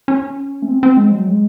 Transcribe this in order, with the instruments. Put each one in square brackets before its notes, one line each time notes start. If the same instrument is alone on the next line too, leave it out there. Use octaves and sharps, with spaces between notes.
[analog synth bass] C#4
A3
C4
C4
G#3
F#3
G#3